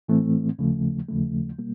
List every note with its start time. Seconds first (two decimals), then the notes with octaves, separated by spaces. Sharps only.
0.08 A2 E3 A3 C4
0.58 D#2 C#3 F3 A3
1.09 D#2 C#3 F3 A3
1.59 B2 G3 A#3